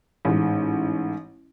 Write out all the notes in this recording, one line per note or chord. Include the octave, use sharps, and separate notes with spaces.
A1 G#2